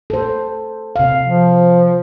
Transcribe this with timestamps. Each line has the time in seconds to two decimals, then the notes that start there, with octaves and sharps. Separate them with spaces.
0.10 A4 C5
0.96 C3 F5
1.26 F3